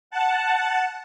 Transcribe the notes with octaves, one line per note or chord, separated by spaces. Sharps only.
F#5 A5